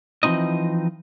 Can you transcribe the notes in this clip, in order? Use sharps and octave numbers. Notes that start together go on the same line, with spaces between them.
E3 F3 C4 D#4 D#5